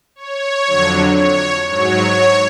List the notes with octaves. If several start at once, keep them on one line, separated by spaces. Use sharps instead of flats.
C#5
F2 D3 F#3
C#5
G#2 F#3 C#5